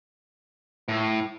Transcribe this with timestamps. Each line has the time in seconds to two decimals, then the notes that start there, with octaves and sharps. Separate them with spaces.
0.88 A2